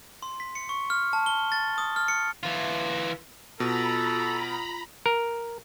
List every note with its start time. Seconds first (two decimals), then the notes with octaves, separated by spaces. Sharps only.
0.22 C6
0.40 B6
0.55 C#7
0.69 C#6
0.90 F6
1.13 A5
1.26 G7
1.52 A6
1.78 D#6
1.96 F6
2.08 C#7
2.43 E3 F4
3.60 B2 F4 A4 A#5 B5
5.06 A#4